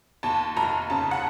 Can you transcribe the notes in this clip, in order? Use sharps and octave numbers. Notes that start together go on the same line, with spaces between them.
D#2 A5
F1 A#5
C#3 A5
F#5